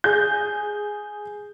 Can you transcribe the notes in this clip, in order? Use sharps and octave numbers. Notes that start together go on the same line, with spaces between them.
G#4 G6